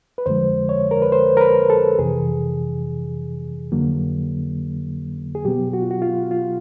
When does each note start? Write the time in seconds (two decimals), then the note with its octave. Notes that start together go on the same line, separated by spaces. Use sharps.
0.18 B4
0.26 F2 D3 F3 G#3 C5
0.69 C#5
0.91 A#4
1.02 B4
1.12 C5
1.37 A#4
1.41 B4
1.70 A4
1.98 F2 C3 E3 G#4
3.72 F2 D3 F#3 A#3
5.35 G#4
5.45 B2 F#3 B3 G4
5.73 F#4
5.82 F4
5.91 F#4
6.02 F4
6.31 F4